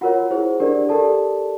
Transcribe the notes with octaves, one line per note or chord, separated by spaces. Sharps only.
F4 F#4 A#4 C#5 F#5
E4 G#4 C5
D4 G4 A#4 D5
G4 A4 A#4 D5 A5